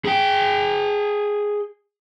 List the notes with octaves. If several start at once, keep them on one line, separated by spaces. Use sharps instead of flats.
G#4 G5